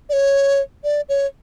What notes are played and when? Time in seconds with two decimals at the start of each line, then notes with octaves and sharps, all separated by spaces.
0.09 D5
0.13 C#5
0.84 D5
1.09 C#5